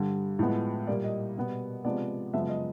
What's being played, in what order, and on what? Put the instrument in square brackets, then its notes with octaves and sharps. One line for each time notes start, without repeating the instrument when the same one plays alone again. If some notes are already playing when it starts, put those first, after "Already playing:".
Already playing: [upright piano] G2 D3 G3
A2 F3 G#3 B3
A#2 G3 A#3 D5
D#5
B2 G3 B3
C3 F3 G#3 B3 D5
F#2 C#3 F3 G#3 B3 E5
D#5